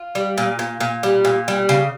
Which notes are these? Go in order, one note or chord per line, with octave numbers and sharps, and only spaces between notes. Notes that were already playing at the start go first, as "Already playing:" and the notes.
Already playing: F4
G3
A#2
A#2
A#2
G3
A#2
G3
C#3